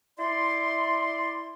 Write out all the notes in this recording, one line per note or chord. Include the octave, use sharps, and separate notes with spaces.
E4 D5 C6